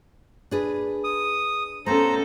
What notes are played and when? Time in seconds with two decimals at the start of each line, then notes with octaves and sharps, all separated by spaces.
0.51 D4 G#4 B4
1.04 D#6
1.86 A3 B3 C#4 A4 C5 A#5